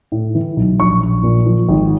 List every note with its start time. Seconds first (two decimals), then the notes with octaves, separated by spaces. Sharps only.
0.12 A2
0.35 E3
0.57 B1
0.80 A#1 C#6
1.02 A#1
1.23 A#2
1.46 F3
1.69 G#1